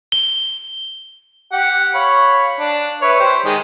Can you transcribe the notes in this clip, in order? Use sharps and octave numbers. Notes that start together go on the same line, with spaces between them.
G7
G4 F#5
C#5 F5 B5
D4
B4 C#5 E5
G4 C5
D#3 G#3